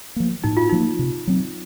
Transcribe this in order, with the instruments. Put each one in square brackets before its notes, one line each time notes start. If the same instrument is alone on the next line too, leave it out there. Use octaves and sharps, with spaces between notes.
[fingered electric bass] F3 A#3
[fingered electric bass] A2 [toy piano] D#4
[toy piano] F4
[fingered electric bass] F3 A#3 [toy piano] D#4
[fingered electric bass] C3
F#3 C4